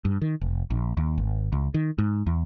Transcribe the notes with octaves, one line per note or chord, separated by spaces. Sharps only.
G2
D#3
F1
A#1
D#2
G#1
C#2
D#3
G#2
E2